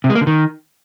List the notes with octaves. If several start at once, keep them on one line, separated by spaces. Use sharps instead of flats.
C3
G#3
A#3
D3
D#3